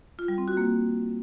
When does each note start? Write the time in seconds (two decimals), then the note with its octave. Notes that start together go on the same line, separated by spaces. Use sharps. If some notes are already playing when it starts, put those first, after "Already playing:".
0.19 F4
0.28 G3
0.38 C4
0.48 F#4
0.57 A#3